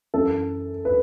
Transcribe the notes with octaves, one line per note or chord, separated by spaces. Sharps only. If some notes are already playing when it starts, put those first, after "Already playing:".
F#2 E3 A4
B4